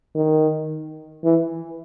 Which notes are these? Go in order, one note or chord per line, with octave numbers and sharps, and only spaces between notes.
D#3
E3